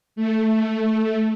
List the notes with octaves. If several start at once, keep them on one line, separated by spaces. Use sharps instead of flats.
A3